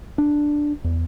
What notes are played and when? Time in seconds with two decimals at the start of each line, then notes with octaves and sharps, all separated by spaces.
0.18 D4
0.84 E2